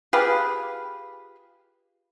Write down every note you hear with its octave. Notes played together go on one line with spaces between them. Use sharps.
F4 G4 G#4 B4